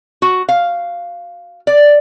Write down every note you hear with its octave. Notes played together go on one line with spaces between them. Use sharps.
F#4
F5
D5